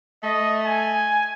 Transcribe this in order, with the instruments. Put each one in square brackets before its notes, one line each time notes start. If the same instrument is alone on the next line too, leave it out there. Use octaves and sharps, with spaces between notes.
[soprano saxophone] A3 [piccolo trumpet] D#5
[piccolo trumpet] G#5